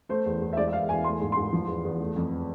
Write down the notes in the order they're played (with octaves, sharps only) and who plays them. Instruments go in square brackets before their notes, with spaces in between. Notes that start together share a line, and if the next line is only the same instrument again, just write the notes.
[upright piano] A3 C5
E2
E2
E5
G#3 D5
E5
E2 F5
E2 G#5
A3 C6
G#2
G#2 C6
F3
E2
E2
A3
F2